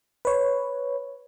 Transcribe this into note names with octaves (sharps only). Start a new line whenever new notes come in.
B4 C#5